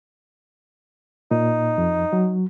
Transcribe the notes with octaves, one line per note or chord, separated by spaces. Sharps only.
A#2 D#4
F2
F#3